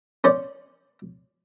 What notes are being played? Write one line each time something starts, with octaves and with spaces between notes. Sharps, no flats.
C#4 C5 D5